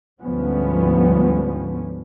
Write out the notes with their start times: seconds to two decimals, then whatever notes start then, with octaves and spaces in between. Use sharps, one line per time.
0.20 D2 G#2 F3 G3 B3 C#4